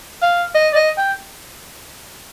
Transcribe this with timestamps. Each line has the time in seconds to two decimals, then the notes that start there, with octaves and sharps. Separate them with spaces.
0.22 F5
0.55 D#5
0.72 D5
0.75 D#5
0.98 G5